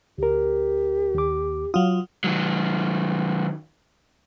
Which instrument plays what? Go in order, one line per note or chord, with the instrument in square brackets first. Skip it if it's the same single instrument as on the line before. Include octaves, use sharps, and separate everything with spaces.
[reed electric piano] D2 A#4 [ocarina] G4
[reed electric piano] D#2 D6
[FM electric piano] F#3 F4 [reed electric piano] D#6
[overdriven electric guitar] D#3 F#3